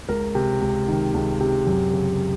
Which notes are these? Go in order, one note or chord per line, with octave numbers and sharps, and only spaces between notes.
C#2 A#4
C3
C#2
D#3
C#2
C3
F#2
C#3